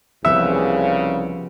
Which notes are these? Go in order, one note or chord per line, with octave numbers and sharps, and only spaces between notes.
C2 C#3 F3 B3 E5